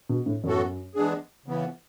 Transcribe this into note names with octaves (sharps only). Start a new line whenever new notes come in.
B2
A2
F#2 A2 E3 B3 F#4 A4
E3 G#3 B3 D4 G#4
C#3 E3 B3